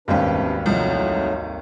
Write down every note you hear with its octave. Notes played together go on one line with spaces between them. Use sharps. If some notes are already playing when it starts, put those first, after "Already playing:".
G#1 D#2 C3 G3 G#3 C#4 D4 B4
C2 F3 F#3 A3 D#4